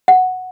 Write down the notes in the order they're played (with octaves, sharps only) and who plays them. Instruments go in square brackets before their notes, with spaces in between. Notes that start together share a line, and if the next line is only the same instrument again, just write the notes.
[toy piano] F#5